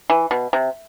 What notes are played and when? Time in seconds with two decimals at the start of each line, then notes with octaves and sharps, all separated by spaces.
0.10 E3
0.31 B2
0.53 C3